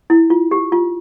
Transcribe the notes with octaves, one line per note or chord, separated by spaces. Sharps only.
E4
F4
G4
F4